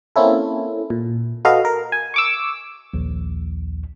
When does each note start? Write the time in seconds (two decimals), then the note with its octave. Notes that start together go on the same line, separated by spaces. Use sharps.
0.16 A#3 C4 C#4 E4 A4
0.90 A#2
1.45 F#4 A4 B4 D#5 F5
1.65 A#4
1.92 G#5
2.14 C#6 D6 E6
2.94 A#1 D#2